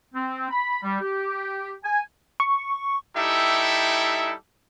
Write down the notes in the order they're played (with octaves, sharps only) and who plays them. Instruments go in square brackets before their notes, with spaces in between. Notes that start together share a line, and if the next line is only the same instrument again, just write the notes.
[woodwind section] C4
B5
G3
G4
G#5
[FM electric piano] C#6
[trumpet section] G3 D#4 E4 G4 A4 E5